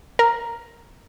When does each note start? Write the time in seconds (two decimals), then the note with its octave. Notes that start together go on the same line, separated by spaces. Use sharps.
0.19 A#4